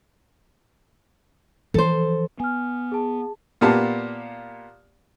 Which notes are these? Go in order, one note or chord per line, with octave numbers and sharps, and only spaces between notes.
E3 F3 A4 C5
B3 G#5 F6
G#4 A5
A#2 A#3 B3 G4 A5